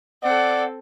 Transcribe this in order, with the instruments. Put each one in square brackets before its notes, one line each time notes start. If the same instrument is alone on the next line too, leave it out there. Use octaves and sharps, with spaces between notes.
[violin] C4 A4 [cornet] D5 [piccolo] F#5